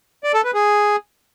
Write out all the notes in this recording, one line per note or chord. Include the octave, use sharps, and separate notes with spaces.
D5
A4
B4
G#4